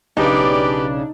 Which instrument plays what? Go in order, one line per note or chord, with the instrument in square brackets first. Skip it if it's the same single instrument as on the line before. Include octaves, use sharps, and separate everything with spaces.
[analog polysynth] B1 C#3 D4 [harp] D#4 [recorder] G4 [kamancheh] B4 D5